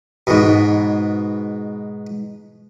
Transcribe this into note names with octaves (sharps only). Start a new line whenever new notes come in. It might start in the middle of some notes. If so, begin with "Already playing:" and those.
G#2 B2